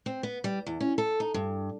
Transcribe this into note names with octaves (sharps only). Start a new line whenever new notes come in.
C4
B3
G3
E2
C#4
A4
D#4
G2